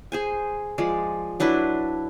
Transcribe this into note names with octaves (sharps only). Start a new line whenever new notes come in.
G#4 C5 G#5
F3 G#3 D5
F#3 D4 E4 B4